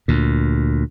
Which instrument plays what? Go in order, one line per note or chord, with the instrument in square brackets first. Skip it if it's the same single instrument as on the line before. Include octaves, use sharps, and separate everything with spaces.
[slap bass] D2 A#2